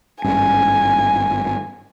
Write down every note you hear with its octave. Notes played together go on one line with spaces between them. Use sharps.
G#1 G2 C#4 G#5